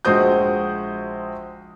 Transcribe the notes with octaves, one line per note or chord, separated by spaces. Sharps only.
A#1 G#3 F#4 C5 D#6 G6